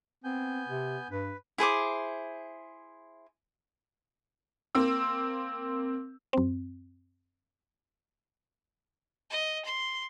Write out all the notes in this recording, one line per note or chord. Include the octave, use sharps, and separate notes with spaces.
B3 C4 G#5 G6
C3
G2 B4
E4 G#4 C5 D6
A#3 C4 E6
F#2 C4
D#5
C6